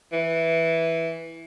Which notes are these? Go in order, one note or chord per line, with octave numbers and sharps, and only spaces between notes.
E3